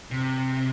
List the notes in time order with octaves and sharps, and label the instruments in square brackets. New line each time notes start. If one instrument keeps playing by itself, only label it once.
[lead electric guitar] C3